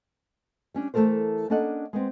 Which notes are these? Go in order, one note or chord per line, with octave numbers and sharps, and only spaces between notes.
G3 C#4 D4
E3 A3 C#4 A4 A#4 C5
A#3 C#4 D4 A4 D#5 F#5
G#3 B3 C4